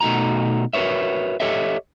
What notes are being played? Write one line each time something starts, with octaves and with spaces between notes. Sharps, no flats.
B2 A3 D#4 F#4 A#5
F#4 A#4 B4 C#5 E5
G4 A4 C#5 D#5 E5